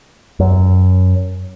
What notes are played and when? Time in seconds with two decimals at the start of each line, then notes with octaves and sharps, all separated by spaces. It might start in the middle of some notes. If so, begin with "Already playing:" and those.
0.40 F#2